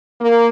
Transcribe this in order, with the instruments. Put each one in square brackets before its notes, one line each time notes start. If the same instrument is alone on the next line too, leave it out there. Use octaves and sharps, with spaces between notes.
[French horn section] A#3